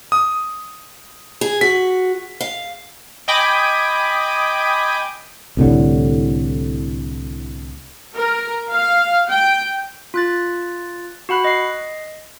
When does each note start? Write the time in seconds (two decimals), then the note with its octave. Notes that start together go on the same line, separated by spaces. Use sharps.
0.12 D#6
1.41 G#4
1.61 F#4 B6
2.40 F5
3.28 D#5 G5 G#5 B5 D6 D#6
5.57 C2 A2 D3
8.16 A#4
8.69 F5
9.29 G5
10.14 F4 F#6 A6
11.29 F#4 F#5 B5 F#6
11.44 D#5 C7